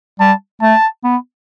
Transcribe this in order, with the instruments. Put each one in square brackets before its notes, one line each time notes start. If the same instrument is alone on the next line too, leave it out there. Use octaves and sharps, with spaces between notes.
[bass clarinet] G3 [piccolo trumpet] A5
[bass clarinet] A3 [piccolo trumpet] A5
[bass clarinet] B3